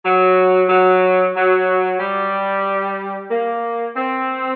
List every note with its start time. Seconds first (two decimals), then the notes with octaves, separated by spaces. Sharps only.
0.05 F#3
0.69 F#3
1.35 F#3
1.99 G3
3.30 A#3
3.95 C4